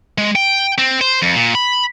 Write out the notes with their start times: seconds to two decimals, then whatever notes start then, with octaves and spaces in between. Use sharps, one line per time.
0.18 G#3
0.35 G5
0.78 C4
1.01 C5
1.22 F2
1.36 A#2
1.55 B5